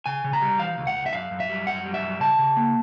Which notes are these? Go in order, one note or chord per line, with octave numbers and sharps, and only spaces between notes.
C#3 G#5
C#3
A#5
G3
E3 F5
C#2
F#5
C#2
E5
F#2 F5
F#2
E5
G3
F#2 F#5
G3
E5
F#2
C#3 A5
C#3
A#3